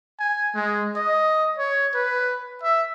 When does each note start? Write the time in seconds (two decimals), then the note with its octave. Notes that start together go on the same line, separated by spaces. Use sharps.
0.19 G#5
0.54 G#3
0.96 D#5
1.58 C#5
1.94 B4
2.63 E5